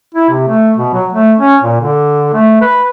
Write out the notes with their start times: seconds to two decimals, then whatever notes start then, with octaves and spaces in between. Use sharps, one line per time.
0.14 E4
0.29 C3
0.48 A3
0.77 B2
0.93 F#3
1.13 A3
1.38 C#4
1.62 A#2
1.81 D3
2.33 A3
2.61 B4